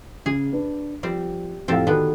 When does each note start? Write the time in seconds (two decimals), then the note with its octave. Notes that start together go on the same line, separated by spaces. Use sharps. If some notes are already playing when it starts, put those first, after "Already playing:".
0.26 C#3 G#4
0.52 D4 B4
1.03 F3 G3 C4
1.68 F2 A2 C4 G4 A4 F5
1.87 D3 D#3 B3 F#4